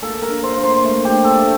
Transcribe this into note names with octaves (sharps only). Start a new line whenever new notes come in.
A#3 A4
A#4
D4
C5
A#3
C5
A3
G4
D4
A4
A3